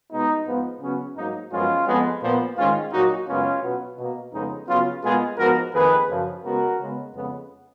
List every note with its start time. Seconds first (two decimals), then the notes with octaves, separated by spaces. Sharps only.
0.12 B2 G#3 B3 D#4
0.46 G#2 F3 B3
0.81 C#3 F#3 B3 C#4
1.17 G#2 F#3 A#3 D#4
1.52 F#2 F3 G#3 B3 C#4 F4
1.87 F2 F3 G#3 B3
2.22 A#2 F3 B3
2.57 G#2 D#3 G#3 C#4 F4
2.93 A#2 F#3 A#3 D#4 F#4
3.28 F#2 C#3 G#3 B3 C#4 F4
3.63 B2 F#3 B3
3.98 B2 A#3
4.33 F2 C#3 G#3 B3 D#4
4.68 C#3 F#3 B3 C#4 F4
5.03 A#2 G#3 B3 F4 G#4
5.38 G#2 F3 B3 F#4 A#4
5.74 F2 D#3 A#3 G#4 B4
6.09 F#2 C#3 F3
6.44 C#3 G#3 B3 F#4 A#4
6.80 C#3 G#3 B3
7.14 F2 C#3 G#3 B3